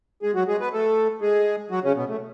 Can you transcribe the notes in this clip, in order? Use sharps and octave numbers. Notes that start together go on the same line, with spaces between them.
G#3 G#4
F#3 F#4
G#3 G#4
B3 B4
A3 A4
G#3 G#4
F#3 F#4
C#3 C#4
B2 B3
A3